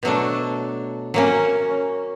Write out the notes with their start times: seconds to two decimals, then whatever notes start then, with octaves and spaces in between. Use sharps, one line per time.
0.03 B2 F#3 A3 D4
1.14 F#3 A#3 C#4